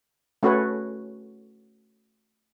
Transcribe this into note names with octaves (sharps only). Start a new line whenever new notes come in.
A3 C#4 F#4 A4 B4 C#5